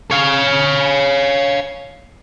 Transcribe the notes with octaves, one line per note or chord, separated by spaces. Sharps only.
C#5 F5